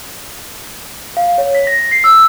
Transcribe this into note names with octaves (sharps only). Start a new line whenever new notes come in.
F5
C#5
B6
A#6
C7
E6